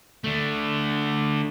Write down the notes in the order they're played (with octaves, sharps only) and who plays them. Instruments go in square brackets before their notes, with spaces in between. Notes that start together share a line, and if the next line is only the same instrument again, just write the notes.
[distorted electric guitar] D3 A3